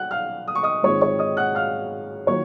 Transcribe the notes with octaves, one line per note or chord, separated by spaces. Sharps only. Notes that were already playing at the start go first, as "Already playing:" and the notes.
Already playing: F#3 F#5 F#6
F5 F6
D#6
C#6
D#5 D#6
G#2 D#3 G#3 C4 F4 C#5 C#6
C#5 C#6
D#5 D#6
F#5 F#6
F5 F6
D#3 F#3 A#3 F4 C#5 C#6